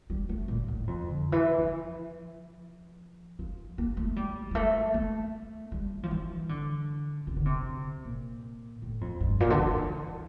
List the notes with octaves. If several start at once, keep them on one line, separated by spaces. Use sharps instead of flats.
G3
A3
A#2
A2
F2
D3
E3
F3
F3
A#3
A3
G3
G3
A3
A3
G3
F3
E3
D3
C3
D3
C3
A#2
A2
F2
G2
A#2
D3
E3